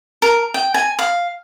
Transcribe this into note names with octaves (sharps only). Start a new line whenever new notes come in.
A#4
G5
G#5
F5